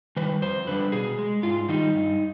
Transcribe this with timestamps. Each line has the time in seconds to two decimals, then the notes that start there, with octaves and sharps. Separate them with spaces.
0.16 D#3 G3 B4
0.42 F2 C5
0.67 D3 G3 B4
0.92 B2 G#4
1.19 G#3
1.43 G#2 F4
1.68 D#3 G3 D#4
1.95 G2